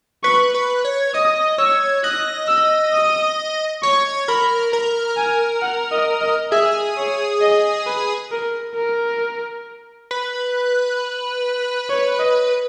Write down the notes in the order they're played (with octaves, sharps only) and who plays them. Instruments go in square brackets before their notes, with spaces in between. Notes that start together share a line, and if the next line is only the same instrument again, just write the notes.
[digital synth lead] B4 [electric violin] C#6
[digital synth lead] B4
C#5
[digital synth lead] D#5 [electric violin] D#6
[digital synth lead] C#5 [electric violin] E6
[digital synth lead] D#5 [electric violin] F#6
[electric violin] E6
D#6
[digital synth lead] C#5 [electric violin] C#6
[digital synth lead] A#4 [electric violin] B5
[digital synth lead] A#4 [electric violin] A#5
[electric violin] G#5
F#5
D#5
D#5
[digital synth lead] G#4 [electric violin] E5
[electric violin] C#5
D#5
B4
A#4
A#4
[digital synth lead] B4
[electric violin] C#5
D#5